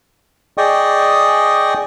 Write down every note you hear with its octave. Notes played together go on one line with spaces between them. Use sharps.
G#4 D5 D#5 G5 C#6 D#6